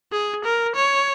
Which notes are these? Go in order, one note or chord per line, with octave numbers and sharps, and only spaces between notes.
G#4
A#4
C#5